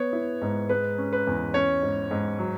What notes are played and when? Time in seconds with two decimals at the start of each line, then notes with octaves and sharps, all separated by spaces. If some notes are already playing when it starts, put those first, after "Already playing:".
Already playing: B3 C#5
0.13 E4
0.41 G#2
0.69 G#3 B4
0.98 C#4
1.13 B4
1.27 E2
1.54 C#4 C#5
1.82 G#2
2.11 G#2
2.39 F#3